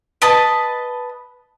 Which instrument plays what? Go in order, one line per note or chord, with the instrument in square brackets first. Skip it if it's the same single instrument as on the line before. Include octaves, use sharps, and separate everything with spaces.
[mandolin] B4 D#5 A5